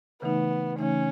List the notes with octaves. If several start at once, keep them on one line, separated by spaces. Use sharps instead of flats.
C#3 E3 A3 B3 D#4
C#3 E3 A3 C#4 D#4